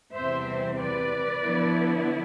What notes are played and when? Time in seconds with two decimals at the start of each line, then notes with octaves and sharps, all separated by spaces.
0.16 E2 C3 G3 C4 C5 E5
0.79 B4 D5
1.44 D3 F3 B3 E4